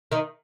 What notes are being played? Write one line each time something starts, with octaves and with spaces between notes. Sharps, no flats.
D#3 D#4